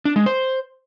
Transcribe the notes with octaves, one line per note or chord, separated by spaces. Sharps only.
D4
G#3
C5